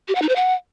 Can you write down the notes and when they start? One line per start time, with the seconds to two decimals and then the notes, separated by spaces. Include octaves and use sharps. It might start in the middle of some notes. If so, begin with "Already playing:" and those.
0.08 G4
0.15 F#5
0.22 D#4
0.29 C5
0.36 F#5